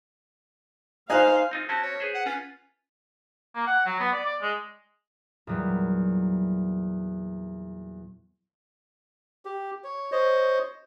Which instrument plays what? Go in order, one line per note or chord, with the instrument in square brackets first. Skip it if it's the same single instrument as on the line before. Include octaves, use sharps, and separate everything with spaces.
[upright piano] D#4 G#5 F#6 [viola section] C5 F5
[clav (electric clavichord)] C4 D#4 F4
[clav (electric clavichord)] C4 C#4 F#4 [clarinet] A5
[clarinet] C#5
[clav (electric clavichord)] G#4 B4 C5
[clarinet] F#5
[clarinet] C#4 [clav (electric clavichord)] F4 B4
[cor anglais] A#3
F#5
F#3
B3
D5
D5
G#3
[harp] E2 A#2 F#3 G3
[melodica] G4
C#5
C5 C#5 D#5